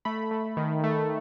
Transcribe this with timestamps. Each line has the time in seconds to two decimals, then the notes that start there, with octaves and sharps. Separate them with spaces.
0.05 A3 B5
0.31 A3
0.57 D#3
0.84 A3